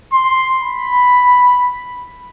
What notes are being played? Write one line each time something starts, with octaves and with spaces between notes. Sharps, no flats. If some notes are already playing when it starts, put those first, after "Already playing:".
C6
B5